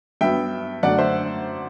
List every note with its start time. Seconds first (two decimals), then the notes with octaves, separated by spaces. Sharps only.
0.21 G2 F#3 B3 E5 G5
0.83 F#2 D3 A3 D5 F#5
0.98 C5 E5